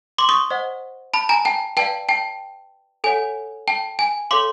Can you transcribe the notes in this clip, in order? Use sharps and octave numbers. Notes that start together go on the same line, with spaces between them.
C6 D6
C#6 D#6
C5 D#5 F#5
A5 B5
G#5 A#5
G5 A5
B4 D5 F5 G5 A5
G5 A5
A4 C#5 F#5 G#5
G5 A5
G#5
A4 C#5 F5 C6 D6